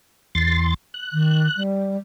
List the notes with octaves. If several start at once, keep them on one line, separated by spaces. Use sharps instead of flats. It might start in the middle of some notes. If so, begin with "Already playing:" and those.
E2 C6 A6
F#6
D#3
G3